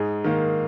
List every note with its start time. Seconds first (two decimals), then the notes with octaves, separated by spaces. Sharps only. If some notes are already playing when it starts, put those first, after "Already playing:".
Already playing: G#2 G#4
0.24 D#3 A#3